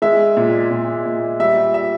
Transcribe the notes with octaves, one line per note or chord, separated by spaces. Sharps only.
G#3 E5
A#2
A#2
A#2
G3 E5
E5